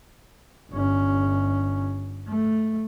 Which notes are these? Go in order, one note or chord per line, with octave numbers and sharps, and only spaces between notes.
G1 C#4
A3